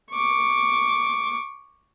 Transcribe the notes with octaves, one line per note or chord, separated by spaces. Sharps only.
C#6 D6